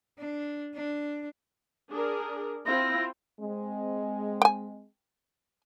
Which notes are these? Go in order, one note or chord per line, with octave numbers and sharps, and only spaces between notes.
D4
D4
D4 G#4 A#4
C4 E4 F4 A#6
G#3 C4
G5 G#5